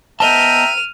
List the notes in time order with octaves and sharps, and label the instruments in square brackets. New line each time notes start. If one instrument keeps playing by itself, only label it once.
[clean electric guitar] B3 D#5 A5 [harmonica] E5 G5 A#5 [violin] F6 D#7